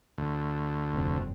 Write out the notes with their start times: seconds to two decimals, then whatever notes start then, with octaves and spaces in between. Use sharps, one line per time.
0.18 D2
0.92 F1 G2 C4